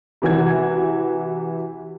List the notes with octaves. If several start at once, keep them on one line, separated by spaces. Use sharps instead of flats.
C3 E3 F#4 G#6